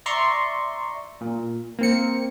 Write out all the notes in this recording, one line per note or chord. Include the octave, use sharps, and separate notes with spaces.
D5 E5 A#5 C6 C#6
A#2
A#3 C4 C#7